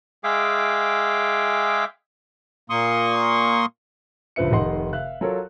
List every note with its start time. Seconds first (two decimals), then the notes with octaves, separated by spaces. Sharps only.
0.24 G#3 G#4 E5 F5 G5 D6
2.70 A#2 A#3 C6 C#6 D#6
4.36 C#2 G2 F3 B4 E5 C#7
4.52 F1 D#3 D#5 F#5 C6
4.93 E5 F5 F#6
5.21 F#3 F4 A4 A#4 C#5